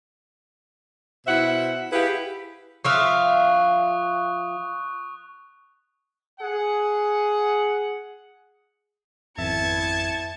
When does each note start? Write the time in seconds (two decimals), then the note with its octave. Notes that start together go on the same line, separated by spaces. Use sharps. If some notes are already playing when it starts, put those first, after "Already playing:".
1.27 B2 E4 C5 E5 F#5
1.92 E4 G4 G#4 B4 F5 F#5
2.85 F3 E5 F5 C#6 D#6 F#6
6.39 G#4 F#5
9.38 G#1 F2 B3 E4 E5 A5 G#6 C#7